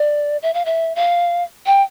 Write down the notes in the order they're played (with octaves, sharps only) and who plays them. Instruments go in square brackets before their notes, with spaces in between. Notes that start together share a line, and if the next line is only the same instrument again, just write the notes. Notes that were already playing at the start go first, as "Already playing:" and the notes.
Already playing: [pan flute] D5
E5
F5
E5
F5
G5